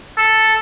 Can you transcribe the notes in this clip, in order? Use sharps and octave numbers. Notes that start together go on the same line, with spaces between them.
A4